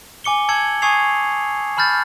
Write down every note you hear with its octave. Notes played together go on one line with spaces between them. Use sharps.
G#5 D6 C#7 G7
A5 E6 G#6 C#7 F#7
G#5 C#6 D#6 G#6 C7 F7
A5 B5 F6 G6 A6